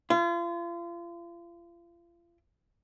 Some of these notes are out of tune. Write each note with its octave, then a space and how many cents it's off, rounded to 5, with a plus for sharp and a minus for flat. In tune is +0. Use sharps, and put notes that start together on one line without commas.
F4 -35